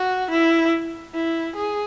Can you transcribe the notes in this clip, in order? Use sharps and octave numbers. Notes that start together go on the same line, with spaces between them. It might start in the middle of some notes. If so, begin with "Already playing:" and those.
Already playing: F#4
E4
E4
G#4